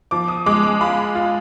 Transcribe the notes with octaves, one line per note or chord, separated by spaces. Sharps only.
F3 D6
D#6
G#3 D6
D6
F4 B5
F4